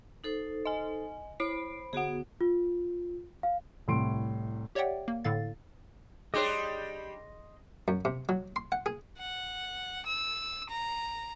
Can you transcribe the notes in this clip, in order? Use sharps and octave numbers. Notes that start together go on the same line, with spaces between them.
D#4 A4 C5
D#5 G#5
E4 C5 B5 C7 D7
D3 B3 F#4 G#4 F#5
F4
F5
C2 A2 C6 D7
G4 C#5 D5 E5 F#5 G5
A#3
A2 D3 A4 F5 A6
G3 D4 G4 G#4 C#5 D#5 C6
F#2
C3
F#3
C6
F#5
G#4
F#5
E6
A#5